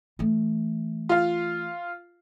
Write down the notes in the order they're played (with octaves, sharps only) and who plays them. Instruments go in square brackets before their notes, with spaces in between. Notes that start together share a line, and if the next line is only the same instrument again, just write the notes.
[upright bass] E3 A3
[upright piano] F4 F5